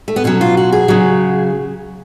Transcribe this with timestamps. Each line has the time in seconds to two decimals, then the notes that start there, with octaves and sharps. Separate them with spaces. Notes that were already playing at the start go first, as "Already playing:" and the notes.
0.08 A3
0.16 B3
0.24 B2 F#3 C#4
0.41 F4
0.57 F#4
0.73 G#4
0.88 C#3 F#3